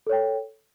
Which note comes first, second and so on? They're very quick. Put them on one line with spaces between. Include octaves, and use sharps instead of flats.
A4 C#5 G5